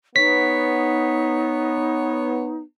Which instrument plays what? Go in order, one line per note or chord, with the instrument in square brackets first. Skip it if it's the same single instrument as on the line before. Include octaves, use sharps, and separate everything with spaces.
[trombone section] B3 [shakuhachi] D#4 [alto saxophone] C#5 [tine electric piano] B6